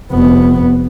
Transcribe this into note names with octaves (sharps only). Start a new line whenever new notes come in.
F1 B3